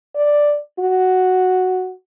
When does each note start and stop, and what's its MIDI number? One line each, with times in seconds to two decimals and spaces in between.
0.16 0.58 74
0.80 1.93 66